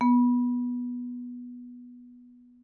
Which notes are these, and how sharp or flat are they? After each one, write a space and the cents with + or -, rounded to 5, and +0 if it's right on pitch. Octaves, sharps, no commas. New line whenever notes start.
B3 -10